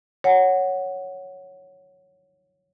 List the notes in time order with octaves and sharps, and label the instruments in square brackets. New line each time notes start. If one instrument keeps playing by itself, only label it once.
[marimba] C#5 F#5 G#5